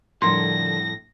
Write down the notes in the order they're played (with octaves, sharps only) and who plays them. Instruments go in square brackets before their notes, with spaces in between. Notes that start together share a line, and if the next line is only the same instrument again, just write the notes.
[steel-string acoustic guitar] F2 A2 G3 [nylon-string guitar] D3 F3 A#4 [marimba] C6 [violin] A#6